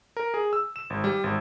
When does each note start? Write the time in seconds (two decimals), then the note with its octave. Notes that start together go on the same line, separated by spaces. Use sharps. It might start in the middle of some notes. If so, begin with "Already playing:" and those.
0.17 A#4
0.34 G#4
0.53 E6
0.76 E7
0.90 G#1
1.04 G3
1.24 G#1